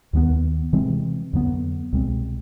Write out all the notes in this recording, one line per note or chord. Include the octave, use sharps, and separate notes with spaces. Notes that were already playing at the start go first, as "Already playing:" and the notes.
D#2 D#3 F#3 B3
C3 E3 G#3 C4
F2 D3 F#3 B3
C2 B2 G#3 C4